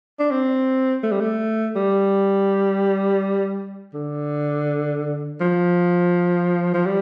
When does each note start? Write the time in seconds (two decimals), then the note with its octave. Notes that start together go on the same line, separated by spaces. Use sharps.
0.19 D4
0.31 C4
1.03 A3
1.12 G3
1.21 A3
1.76 G3
3.94 D3
5.41 F3
6.74 F3
6.86 G3